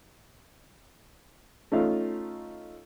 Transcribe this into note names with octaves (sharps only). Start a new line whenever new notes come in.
A3 C#4 D#4 F4 F5